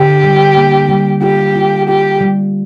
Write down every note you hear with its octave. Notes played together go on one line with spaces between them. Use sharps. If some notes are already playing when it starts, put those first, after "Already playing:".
Already playing: D3 G4
G3
A#3
G3
F4 G4
F4
F4 G4
G3